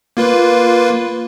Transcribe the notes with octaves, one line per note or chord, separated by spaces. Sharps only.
A#3 F4 B4